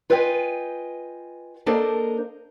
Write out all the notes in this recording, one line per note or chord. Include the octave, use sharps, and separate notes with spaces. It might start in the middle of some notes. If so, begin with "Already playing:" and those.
F4 B4 D#5 G5 G#5
A#3 D4 A4 A#4 C5 D#5